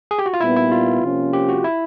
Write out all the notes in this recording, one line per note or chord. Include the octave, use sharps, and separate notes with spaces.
G#4
G4
F#4
F4
A#2 G3 B3 D#4 E4
E4
F4
C3 F3 A#3 C#4
G4
F#4
E4